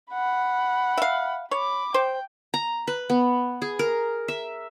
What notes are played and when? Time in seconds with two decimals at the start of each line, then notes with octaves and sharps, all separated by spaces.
0.12 F#5 B5
0.97 E5 F5
1.51 C#5 B5 D6
1.94 C5 G5
2.54 A#5
2.87 B4
3.10 B3
3.62 G#4
3.79 A#4
4.28 E5